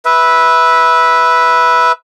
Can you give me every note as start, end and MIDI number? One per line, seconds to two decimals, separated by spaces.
0.05 1.92 71
0.05 1.92 76